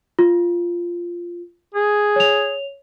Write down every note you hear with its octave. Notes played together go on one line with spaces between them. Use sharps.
F4
G#4
C#5 F7